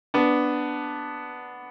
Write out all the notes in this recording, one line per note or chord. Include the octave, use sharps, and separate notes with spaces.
B3 D4